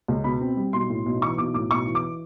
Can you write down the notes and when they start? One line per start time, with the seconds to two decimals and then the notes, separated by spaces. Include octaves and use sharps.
0.08 C#2
0.24 B2 B5
0.41 C4
0.57 G3
0.73 B1 C6
0.90 A2
1.06 B1
1.22 E3 C#6
1.38 B1 D6
1.54 A2 D6
1.70 B1 C#6
1.87 E3
1.95 D6